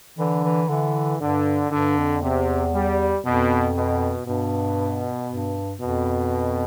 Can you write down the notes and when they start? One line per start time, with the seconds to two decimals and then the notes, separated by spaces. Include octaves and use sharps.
0.18 D3 E3
0.44 E3
0.69 D3 E3
1.20 G2 D3
1.71 G2 D3
1.97 F2
2.22 E2 C3
2.73 G3
3.24 F2 B2
3.76 B2
4.26 G2 B2
5.29 G2
5.80 F2 B2